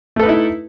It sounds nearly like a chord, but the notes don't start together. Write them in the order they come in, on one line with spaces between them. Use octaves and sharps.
A3 A4 B4 D#4 E4